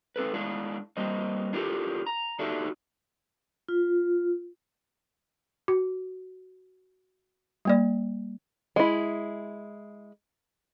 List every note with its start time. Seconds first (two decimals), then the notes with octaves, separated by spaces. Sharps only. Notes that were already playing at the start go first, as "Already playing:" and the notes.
0.16 C4 A4 B4
0.34 G#3 D4 E4 F5
0.97 G3 A#3 C4 D#5
1.53 D4 E4 F4 G4 A4 A#4
2.07 A#5
2.39 D4 D#4 F#4 G4 A4 E5
3.69 F4
5.68 F#4
7.65 G3 A#3 D5
8.76 G#3 E4